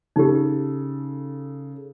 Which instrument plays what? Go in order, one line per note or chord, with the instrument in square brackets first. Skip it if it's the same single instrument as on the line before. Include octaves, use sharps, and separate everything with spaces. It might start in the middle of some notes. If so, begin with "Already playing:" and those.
[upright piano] C#3 A4 [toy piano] D#4 G4